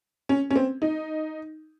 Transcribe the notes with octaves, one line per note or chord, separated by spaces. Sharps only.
C#4
C#4
C4
D#4